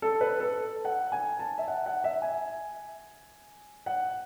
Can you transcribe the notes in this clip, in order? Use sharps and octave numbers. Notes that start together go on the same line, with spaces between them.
A4
B4
A4
F#5
G#5
A5
E5
F#5
F#5
E5
G#5
F#5